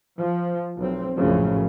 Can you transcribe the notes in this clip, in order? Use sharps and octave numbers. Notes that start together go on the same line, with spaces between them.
F3
B1 C4
A#1 F#2 A2 C#3 F3